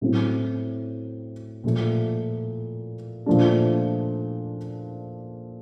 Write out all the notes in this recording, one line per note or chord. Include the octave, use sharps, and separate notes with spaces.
A2 F#3 A3 C4
A#2 F3 A3
A#2 F3 A3 D4